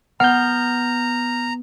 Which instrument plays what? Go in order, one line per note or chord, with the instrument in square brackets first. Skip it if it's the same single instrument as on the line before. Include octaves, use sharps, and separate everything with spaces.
[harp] B3 [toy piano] F#5 [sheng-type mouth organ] A#5 [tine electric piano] F6 G6